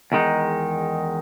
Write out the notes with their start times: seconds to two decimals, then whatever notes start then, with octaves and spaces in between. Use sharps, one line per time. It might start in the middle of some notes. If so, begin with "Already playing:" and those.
0.12 E2 D#3 G#3 D#4